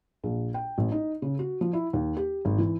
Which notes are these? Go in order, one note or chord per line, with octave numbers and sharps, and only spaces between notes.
A#1
G5
A1
D#4
C#3
F#4
F3
E4
D#2
G4
G#1
E3